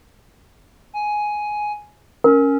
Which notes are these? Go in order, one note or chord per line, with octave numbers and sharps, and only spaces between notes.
G#5
C#4 A#4